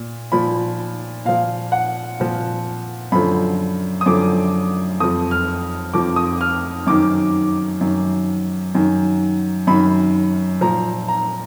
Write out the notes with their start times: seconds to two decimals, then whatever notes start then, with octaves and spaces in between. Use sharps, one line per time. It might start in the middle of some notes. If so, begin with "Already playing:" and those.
Already playing: A#2
0.32 A#2 F3 B5
1.25 A#2 F3 F5
1.72 F#5
2.20 A#2 F3
3.12 F#2 D3 F3 B5
4.01 D#6
4.06 F#2 D3 F3 D6
5.00 F2 F3 D#6
5.31 F6
5.93 F2 F3 D6
6.16 D#6
6.41 F6
6.87 F#2 D#3 D6
7.80 F#2 D#3
8.75 F#2 D#3
9.67 F#2 D#3 B5
10.61 A#2 F3 A#5
11.08 A#5